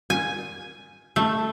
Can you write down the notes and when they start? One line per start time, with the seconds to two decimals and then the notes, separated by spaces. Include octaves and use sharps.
0.10 G#5
1.16 A3